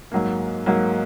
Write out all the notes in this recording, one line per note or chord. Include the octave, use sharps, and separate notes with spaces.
G#2 F#3 A#3
G#2 F#3 A#3